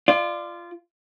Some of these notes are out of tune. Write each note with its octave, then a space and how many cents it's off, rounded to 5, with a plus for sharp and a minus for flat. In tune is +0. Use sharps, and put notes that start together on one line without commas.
F4 -15 D5 +25